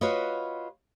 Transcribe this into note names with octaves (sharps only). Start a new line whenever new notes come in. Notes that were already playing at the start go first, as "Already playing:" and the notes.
F4 F#4 B4 C#5 D#5